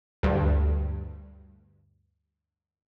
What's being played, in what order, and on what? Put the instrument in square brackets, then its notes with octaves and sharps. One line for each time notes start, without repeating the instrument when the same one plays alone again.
[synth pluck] D2 G2